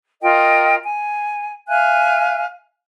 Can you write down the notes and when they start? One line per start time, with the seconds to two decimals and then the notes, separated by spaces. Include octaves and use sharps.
0.22 F4 A#4 D#5 G5
0.84 G#5
1.69 E5 F5 G#5 F#6